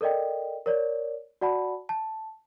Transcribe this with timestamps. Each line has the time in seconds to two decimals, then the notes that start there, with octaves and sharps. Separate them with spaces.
0.01 A4 A#4 D5 D#5 G5
0.66 A#4 C#5 D5
1.41 F#4 D5 F#5 A5 B5
1.89 A5